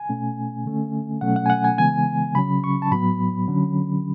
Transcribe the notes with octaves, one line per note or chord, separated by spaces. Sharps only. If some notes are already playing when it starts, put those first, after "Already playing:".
Already playing: G#5
B2 A3 C#4
D3 A3 C#4
B2 F#3 A3 C#4 F#5
F#5
G#5
F#5
G#5
C#3 E3 G#3 B3 G#5
C#3 F#3 C#4 B5
C#6
A5
A2 F#3 B3 B5
D3 F#3 C#4